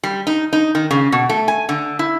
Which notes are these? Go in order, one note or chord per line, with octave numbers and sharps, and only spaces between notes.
G3
D#4
D#4
D#3
C#3
B2
A3
G#5
D3
E4